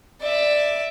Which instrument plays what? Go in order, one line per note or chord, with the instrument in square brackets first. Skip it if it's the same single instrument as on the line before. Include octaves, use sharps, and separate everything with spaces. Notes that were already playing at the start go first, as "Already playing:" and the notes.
[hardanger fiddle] D5 E5